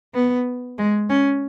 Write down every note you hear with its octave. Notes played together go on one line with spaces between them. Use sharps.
B3
G#3
C#4